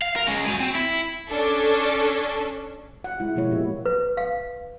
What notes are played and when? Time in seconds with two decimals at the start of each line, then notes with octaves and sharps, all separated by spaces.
0.02 F5
0.16 A#4
0.28 G#3 C#4
0.47 F#4 G#5
0.60 C4
0.75 E4
1.29 C#4 D4 A4
3.04 F#5
3.20 G#3 E4
3.36 B2 F3 A#3 E4 C#5
3.51 A#2 G4
3.86 B4
4.17 F5